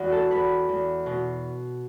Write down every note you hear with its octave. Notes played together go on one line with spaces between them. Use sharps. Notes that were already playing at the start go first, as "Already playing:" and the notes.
Already playing: E2 F#4 F#5
A4 A5
E2 B4 B5
E2
B2